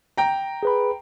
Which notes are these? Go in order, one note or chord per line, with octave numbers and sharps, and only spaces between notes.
G5 A#5
G#4 B4 B5